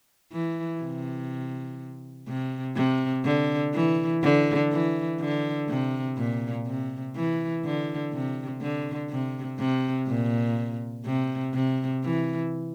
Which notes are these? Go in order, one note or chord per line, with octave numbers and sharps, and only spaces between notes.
E3
C3
C3
C3
D3
E3
D3
E3
D3
C3
A#2
C3
E3
D3
C3
D3
C3
C3
A#2
C3
C3
E3